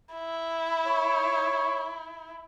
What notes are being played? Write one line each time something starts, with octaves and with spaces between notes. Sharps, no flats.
E4
C#5